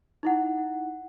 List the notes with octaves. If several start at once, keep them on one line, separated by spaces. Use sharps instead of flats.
D#4 E4 F#5